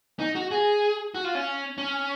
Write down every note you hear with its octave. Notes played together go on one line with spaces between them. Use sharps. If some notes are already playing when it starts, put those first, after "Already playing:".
D#4
F#4
G#4
F#4
F4
C#4
C#4